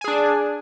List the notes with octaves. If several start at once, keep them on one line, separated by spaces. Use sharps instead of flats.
D4 G#4 G#5